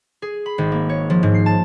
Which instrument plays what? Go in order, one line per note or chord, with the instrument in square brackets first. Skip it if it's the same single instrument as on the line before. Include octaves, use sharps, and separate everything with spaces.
[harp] G#4
B5
G#1
A#3
C#5
F3
G#2
C7
A5